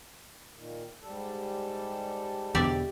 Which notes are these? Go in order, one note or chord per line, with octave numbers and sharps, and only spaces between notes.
A#2 D#3
G#2 G3 A4
E2 B2 D3 G4 D5 E5